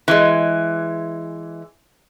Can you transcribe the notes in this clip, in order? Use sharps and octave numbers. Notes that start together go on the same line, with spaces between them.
E3 G#3